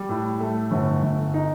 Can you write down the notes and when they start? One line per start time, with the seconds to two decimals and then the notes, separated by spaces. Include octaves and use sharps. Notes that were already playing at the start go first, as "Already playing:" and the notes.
Already playing: G3
0.09 A2
0.40 A3
0.71 G1
1.02 G1
1.34 D#4